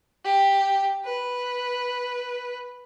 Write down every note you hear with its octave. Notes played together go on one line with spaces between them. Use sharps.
G4
B4